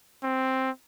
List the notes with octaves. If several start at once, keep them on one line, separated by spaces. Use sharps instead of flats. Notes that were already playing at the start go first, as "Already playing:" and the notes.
C4